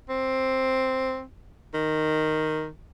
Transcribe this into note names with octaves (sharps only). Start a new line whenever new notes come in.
C4
D#3